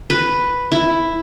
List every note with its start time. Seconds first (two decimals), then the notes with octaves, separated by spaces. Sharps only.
0.10 B4
0.72 E4